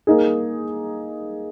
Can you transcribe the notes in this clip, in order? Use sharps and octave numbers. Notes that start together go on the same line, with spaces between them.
A#3 D#4 G#4